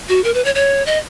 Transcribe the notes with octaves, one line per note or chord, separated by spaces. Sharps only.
F#4
A#4
B4
C#5
C#5
D#5